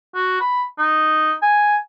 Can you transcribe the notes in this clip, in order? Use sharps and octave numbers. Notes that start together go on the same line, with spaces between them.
F#4
B5
D#4
G#5